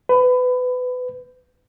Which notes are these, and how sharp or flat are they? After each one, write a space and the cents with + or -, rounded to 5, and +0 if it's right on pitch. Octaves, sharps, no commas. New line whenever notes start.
B4 +25